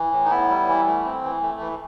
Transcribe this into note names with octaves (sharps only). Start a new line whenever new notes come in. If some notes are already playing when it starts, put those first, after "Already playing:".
Already playing: E3
A2
D#4
B3 E4
G3
E3
A3
C4
E3
A3
E3